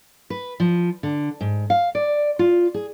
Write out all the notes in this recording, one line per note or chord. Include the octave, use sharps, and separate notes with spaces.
B4
F3
D3
G#2
F5
D5
F4
G#4